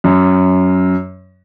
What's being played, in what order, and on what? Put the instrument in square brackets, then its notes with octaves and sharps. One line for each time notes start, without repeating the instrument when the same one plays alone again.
[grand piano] F#2